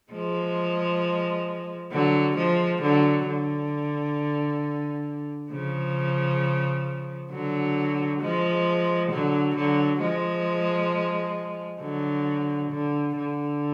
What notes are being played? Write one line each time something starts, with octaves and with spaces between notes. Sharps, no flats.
F3 G#3
D3 F#3
F3 G#3
D3 F#3
D3
C#3 F3
D3 F#3
F3 G#3
D3 F#3
D3 F#3
F3 G#3
D3 F#3
D3
D3